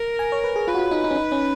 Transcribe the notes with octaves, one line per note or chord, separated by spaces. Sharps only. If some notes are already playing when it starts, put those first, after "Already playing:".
Already playing: A#4
G#5
C#5
B4
G#4
F4 B4
F#4
F4
D#4
D#4
C#4
D#4
C#4